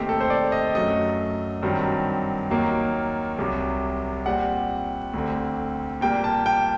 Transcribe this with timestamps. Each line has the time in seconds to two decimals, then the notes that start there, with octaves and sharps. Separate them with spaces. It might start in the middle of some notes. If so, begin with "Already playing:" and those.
Already playing: D#2 D#3 A3 C4 G4
0.09 A4
0.21 C5
0.30 D5
0.52 D#5
0.75 F#2 F#3 A3 D#5
1.63 G2 D#3 F#3 C4
2.50 D#2 D#3 F#3 A#3
3.38 C2 C3 F#3
4.26 A#2 G3 C4 F#5
5.14 D2 D3 A3 C4
6.01 A#2 G3 A#3 G5
6.24 A5
6.46 G5